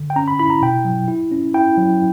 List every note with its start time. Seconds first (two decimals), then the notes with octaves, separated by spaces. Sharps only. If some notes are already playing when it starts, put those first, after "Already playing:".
Already playing: D3
0.10 G5
0.16 C#4 A#5
0.28 B5
0.39 E4 B5
0.50 A#5
0.62 B2 G5
0.85 F#3
1.08 E4
1.31 C#4
1.54 E4 G5
1.78 F#3